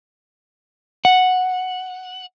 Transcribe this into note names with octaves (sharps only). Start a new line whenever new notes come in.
F#5